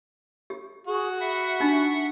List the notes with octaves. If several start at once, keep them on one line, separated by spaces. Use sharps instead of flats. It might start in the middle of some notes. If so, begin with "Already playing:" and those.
G4
F#4 G#4
E5 F#5 B5
D4 D#4 G4